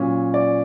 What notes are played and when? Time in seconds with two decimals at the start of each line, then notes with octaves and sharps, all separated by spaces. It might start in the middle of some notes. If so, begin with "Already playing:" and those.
Already playing: A#2 F#3 C#4
0.34 D5